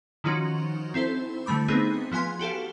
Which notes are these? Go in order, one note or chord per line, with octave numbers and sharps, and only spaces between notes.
D#3 F3 C#4 D#4 F#4
C4 E4 A4 C5
D3 G3 A3 B5 D6
A3 B3 C4 D#4 G#4
F3 B3 F5 G#5 C6
F#4 G4 A4 F5